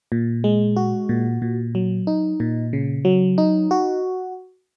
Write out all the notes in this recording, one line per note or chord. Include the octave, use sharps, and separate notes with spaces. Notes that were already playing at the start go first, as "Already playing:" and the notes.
A#2
G#3
F#4
A#2
A#2
F#3
D#4
A#2
C#3
F#3
D#4
F#4